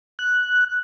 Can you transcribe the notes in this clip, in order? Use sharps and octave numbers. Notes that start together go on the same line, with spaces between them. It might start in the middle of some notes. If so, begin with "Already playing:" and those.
F#6